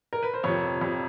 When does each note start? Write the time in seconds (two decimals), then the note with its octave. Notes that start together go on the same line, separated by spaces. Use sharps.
0.13 A#4
0.23 B4
0.34 C5
0.43 F2 C3 F3 C#5
0.81 F2 C3 F3